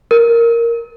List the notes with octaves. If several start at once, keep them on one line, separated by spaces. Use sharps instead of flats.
A#4